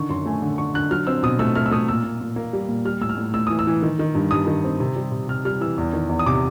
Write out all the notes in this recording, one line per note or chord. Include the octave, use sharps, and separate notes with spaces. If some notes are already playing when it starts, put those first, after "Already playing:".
Already playing: D3 D#3 C#6
F#2 C6
A3 G#5
D3
D3 C#6
D3 F#6
F#3 F6
C4 E6
B2 D#6
A3 E6
A3 F6
E6
A3 D#6
A#2 E6
A#2
A#2
A#3
G3
A#2
G3 F6
A2 E6
F6
A2
A2 E6
E3 D#6
E6
E3
D#3
D#3
G2
G2 D#6
D#3
C4
C3
G3
C3
C3 F6
G3 F6
E3 E6
E2
D#3
E2
D#6
C3 D6